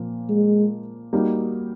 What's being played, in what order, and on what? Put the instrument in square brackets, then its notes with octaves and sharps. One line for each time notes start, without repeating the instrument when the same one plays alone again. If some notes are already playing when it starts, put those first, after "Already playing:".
Already playing: [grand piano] A#2 F3 A#3
[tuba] G#3
[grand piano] G3 A#3 D#4 F#4